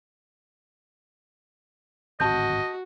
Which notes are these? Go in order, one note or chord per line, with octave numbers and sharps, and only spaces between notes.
D1 G#1 C4 F#4 D#5 A5 G6